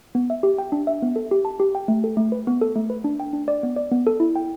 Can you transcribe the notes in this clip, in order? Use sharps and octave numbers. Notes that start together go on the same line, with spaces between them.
B3
E5
G4
G5
D4
E5
B3
A4
G4
A5
G4
G5
A3
A4
A3
B4
B3
A4
A3
B4
D4
G5
D4
D5
B3
D5
B3
A4
E4
G5